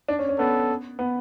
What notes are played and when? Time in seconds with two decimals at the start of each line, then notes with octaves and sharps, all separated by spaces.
0.08 D4
0.19 C#4
0.29 C#4
0.38 B3 A4
0.99 B3